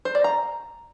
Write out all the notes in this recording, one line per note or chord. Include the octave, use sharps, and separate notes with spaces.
C5
D5
A#5